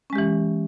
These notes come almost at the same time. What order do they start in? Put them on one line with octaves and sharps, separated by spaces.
C#4 G#3 G4 E3